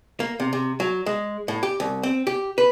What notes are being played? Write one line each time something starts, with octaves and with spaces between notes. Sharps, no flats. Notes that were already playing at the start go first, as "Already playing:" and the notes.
A#3
C3
C3
F#3
G#3
A2
G4
C2
C4
G4
B4